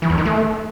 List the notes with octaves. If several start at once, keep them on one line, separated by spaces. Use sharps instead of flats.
E3
E2
D#3
A3